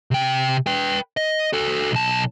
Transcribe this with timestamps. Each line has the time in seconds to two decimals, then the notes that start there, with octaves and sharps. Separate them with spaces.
0.11 C3 G5
0.67 B4 G5
1.17 D#5
1.53 F#4 A4
1.92 B1 A5